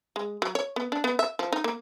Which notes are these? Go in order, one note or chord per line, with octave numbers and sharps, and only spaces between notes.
G#3
F#3
C#5
B3
D4
B3
E5
F3
D#4
A#3